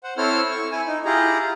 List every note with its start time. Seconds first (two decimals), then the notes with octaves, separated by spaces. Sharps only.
0.03 C5 F#5
0.18 C4 E4 A4 C5 C#5 F6
0.51 C#6
0.72 E4 G#5
0.87 D#4
1.05 E4 F4 G4 G#4 A#5